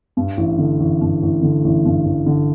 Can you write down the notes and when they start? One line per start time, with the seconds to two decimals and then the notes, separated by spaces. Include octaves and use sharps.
0.17 G2
0.37 A1
0.58 D3
0.80 A1
1.01 G2
1.22 A1
1.42 D3
1.64 A1
1.85 G2
2.06 A1
2.26 D3